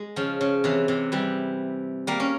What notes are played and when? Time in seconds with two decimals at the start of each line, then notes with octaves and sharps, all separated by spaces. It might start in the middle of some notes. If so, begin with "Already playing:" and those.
Already playing: G#3
0.16 C#3 F3
0.41 C#3
0.64 C3 E3
0.88 C3 E3
1.12 E3 G3
2.07 G3 A#3
2.20 C#4